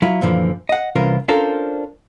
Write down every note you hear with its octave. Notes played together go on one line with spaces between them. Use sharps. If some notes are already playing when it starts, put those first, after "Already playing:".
F#3 E4 F4
F#2 A#2 D3 E3 F3
D#5 F#5
C2 E3 C#4 F4 A#4
C#4 D4 F4 A4 A#4 C5